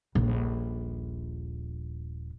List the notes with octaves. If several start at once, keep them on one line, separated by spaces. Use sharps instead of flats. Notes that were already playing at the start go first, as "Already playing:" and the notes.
D#1 A#1